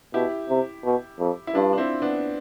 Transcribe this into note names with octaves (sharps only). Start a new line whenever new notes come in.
B2 E4 G4
C3
B2
F2
E4
G2 D4 F4
D4
C4 E4
B3 D4